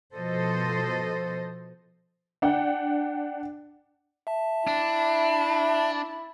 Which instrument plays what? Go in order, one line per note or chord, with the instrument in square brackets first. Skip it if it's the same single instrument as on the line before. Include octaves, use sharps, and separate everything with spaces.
[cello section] B2 F3 A4 C5 D#5
[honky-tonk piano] D4 F#5 G5
[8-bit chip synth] E5 A5
[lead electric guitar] D4 [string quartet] E4